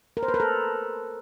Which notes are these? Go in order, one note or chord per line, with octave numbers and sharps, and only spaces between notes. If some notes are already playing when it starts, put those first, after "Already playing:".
A#4
C5
B4
A#4
A4